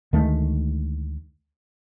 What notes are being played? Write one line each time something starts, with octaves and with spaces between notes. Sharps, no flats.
D2 D#3 G#3 A3